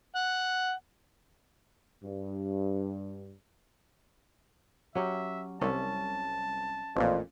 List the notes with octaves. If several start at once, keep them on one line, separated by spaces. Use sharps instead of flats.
F#5
G2
F#3 C#4 G4 E5
C2 C#4 E5 A5
A1 F2 A#2